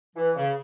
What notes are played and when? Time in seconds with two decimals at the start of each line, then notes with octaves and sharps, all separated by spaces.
0.15 E3
0.35 C#3